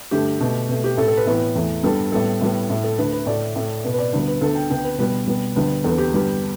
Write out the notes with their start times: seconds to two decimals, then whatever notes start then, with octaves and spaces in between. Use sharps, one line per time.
0.11 G2 D3 A3 G4
0.40 B2 A3
0.69 B2 A3
0.84 G4
0.97 A2 A3 A4
1.08 A4
1.17 B4
1.27 A2 E3 B3
1.56 E2 E3 A3
1.83 G2 G3 B3 A4
2.12 A2 G3 B3 A4
2.41 A2 G3 B3
2.70 A2 A3
2.84 A4
2.98 D2 D3 A3 B4
3.13 B4
3.26 A2 A3 D5
3.56 A2 A3
3.84 B2 B3
3.94 B4
3.99 D5
4.13 D2 D3 G3 B3 B4
4.28 B4
4.41 D2 D3 B3 A4
4.55 G5
4.70 D2 D3 B3 G5
4.84 B4
4.98 B2 G3 B3 B4
5.27 B2 G3 B3
5.56 D2 D3 G3 B3
5.84 E2 D3 B3 A4
5.98 G4
6.14 G2 D3 G3 B3